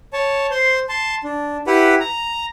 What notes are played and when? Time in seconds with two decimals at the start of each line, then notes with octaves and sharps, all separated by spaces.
0.13 C#5 A5
0.51 C5 C6
0.89 A5 C6
1.24 D4
1.67 E4 G4 B4 F#5 B5
2.00 A#5